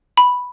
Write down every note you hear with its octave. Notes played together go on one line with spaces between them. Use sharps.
B5